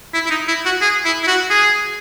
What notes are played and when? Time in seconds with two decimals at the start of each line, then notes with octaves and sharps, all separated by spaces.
0.14 E4
0.26 E4
0.31 D#4
0.48 E4
0.66 F#4
0.81 G#4
1.05 E4
1.23 E4
1.27 F#4
1.50 G#4